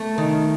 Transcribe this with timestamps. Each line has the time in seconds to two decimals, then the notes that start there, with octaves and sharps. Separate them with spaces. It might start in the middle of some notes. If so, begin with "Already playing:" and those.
Already playing: A3
0.18 D#3